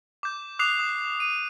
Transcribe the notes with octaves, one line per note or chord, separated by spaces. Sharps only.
D6 G6
D6 D#6 F#6 C7 F7
D#6
D#7